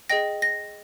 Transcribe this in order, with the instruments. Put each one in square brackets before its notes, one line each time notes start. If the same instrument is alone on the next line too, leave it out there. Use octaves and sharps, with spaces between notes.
[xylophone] G#4 D#5 G5 A#6
A#6